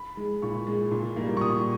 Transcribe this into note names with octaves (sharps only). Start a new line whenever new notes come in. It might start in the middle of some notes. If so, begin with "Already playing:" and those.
Already playing: B5
G#3
A#2 C#6
G#3
A#2
G3 A#3
C#6
A#2 D#6